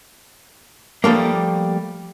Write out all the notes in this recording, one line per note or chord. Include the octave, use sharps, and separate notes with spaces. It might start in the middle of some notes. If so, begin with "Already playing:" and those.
F3 G3 A3 A#3